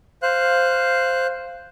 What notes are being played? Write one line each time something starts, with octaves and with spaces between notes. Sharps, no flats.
C5 F5 F#6